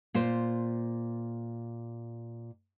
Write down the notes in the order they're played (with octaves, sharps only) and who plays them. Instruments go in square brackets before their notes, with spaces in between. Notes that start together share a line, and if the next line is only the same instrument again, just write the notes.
[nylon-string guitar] A#2 F4 C5